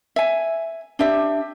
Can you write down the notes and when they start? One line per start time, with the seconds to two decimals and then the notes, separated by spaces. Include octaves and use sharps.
0.16 E5 G#5
0.99 D4 G4 E5